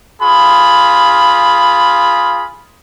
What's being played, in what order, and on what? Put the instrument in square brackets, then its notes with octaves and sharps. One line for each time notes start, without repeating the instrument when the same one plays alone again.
[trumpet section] F4 G#4 B5